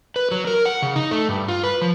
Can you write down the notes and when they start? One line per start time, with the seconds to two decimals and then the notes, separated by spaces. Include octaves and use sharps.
0.16 B4
0.31 F#3
0.47 A#4
0.65 F#5
0.82 C#3
0.96 D#4
1.11 A3
1.29 G2
1.48 F4
1.63 B4
1.82 F3